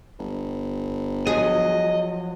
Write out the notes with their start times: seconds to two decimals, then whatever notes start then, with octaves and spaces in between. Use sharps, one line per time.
0.19 G1
1.27 F3 F#3 G#4 D#5